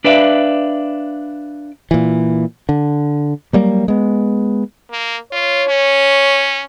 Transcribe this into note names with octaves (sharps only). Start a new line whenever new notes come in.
D4 B4 D5 E5 F5
A#2 E3
D3
F#3 G3 A#3
G#3 B3
A#3
F4 C#5
C#4